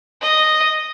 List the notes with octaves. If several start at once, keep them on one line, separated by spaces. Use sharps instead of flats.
D#5